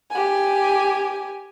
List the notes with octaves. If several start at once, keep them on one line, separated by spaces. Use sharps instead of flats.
G4 G#5